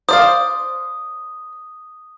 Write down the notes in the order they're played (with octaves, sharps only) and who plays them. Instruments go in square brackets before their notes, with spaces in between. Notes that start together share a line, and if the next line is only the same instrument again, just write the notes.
[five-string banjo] C5 D5 F5 [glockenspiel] D#6